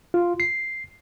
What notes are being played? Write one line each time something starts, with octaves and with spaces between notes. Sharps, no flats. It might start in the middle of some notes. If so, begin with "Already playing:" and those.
F4
C7